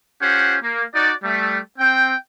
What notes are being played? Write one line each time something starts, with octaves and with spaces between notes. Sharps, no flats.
C#4 F4 G4 C5 F#5
A#3
D#4 F#4 D5
G3 A3
C4 G5